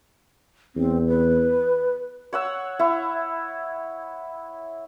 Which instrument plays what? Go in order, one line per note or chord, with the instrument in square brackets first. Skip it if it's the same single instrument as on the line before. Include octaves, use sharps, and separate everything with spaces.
[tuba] E2 [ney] C4
[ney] B4
[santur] C#5 F#5 E6
E4 C#5